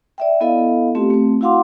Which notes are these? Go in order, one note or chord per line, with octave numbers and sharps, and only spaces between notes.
D5 E5 G5
B3 E4 A4 D#5 F5
A3 C4 F4 G4
A3 C4
E4 F#4 F5 F#5 C6 D6